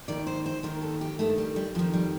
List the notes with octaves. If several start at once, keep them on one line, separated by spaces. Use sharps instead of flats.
D#2 D#3 D5
C5
C5
D#2 D#3 A#4
A4
G4
G2 D#3 A3
G3
G3
F2 D#3 F3
G3